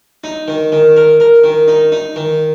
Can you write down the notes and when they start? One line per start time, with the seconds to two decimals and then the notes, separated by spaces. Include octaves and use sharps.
0.24 D#4
0.48 D#3
0.72 D#3
0.97 A#4
1.20 A#4
1.44 D#3
1.68 D#4
1.92 D#4
2.16 D#3